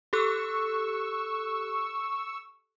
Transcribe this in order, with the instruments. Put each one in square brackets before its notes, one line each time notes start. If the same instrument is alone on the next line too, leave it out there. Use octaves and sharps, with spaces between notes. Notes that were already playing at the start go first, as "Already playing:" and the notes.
[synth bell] G4 A4 F#6 [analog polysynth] C#6 E6